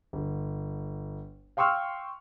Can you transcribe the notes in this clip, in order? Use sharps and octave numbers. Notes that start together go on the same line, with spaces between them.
G1
F5 G5 C6 C#6 E6 F6